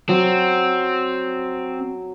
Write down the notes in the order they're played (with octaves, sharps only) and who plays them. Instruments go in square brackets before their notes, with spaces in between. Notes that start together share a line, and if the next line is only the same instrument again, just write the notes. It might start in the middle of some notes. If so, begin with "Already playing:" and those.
[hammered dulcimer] F#3 [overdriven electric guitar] C4